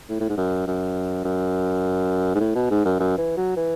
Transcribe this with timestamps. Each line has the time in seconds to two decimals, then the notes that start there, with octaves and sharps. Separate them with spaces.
0.09 A2
0.20 A2
0.29 G#2
0.37 F#2
0.67 F#2
1.24 F#2
2.35 G#2
2.40 A2
2.55 B2
2.70 G#2
2.85 F#2
2.99 F#2
3.18 E3
3.37 F#3
3.57 E3